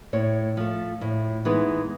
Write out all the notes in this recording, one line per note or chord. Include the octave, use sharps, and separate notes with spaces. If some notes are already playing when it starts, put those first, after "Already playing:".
A2 C#5
F3 A3
A2
E3 G#3 B3 D#4